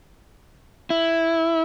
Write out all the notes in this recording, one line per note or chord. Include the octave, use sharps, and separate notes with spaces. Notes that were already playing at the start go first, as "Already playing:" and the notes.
E4